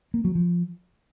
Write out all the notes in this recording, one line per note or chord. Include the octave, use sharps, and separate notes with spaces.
A#3
F#3
F3